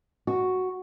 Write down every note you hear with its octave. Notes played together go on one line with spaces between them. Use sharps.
F#4